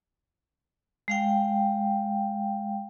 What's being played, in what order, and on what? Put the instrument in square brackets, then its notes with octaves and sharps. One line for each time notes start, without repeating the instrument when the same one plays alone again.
[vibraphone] G#3 F5 G5